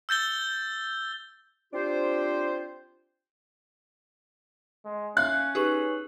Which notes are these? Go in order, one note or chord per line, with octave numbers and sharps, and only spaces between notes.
E6 G6 A6 G7
C4 D4 F4 G4 C5
G#3
C#4 E5 F5 F#6 G6
D#4 G4 G#4 B4 C#6 F#7